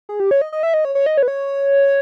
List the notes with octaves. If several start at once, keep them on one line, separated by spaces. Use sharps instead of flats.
G#4
G4
C#5
D#5
D#5
E5
D#5
C#5
C#5
D#5
C#5
B4
C#5